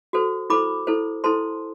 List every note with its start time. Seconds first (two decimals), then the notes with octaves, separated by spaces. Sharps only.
0.13 F#4 A4 C5
0.50 E4 A4 C5 B5 D6
0.87 E4 A4 C5
1.24 E4 A4 C5 A5 C6